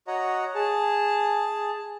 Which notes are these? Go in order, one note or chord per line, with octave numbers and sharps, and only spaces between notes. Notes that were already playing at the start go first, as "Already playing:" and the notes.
F#4 C#5 D#5 F#5 A#5
G#4 A5